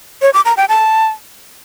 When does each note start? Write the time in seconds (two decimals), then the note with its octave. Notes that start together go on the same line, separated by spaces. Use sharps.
0.22 C#5
0.34 D6
0.45 A#5
0.57 G5
0.69 A5